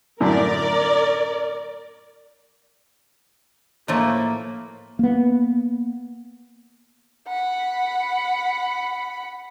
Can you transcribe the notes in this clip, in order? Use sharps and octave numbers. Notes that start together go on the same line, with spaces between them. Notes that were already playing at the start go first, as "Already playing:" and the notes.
F#2 A2 D3 A#4 D5
A2 F3 A3 A#3
A#3 B3
F#5 B5